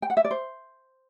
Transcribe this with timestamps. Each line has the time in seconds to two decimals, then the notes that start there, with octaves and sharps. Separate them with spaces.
0.02 G5
0.10 F#5
0.17 E5
0.25 D5
0.31 C5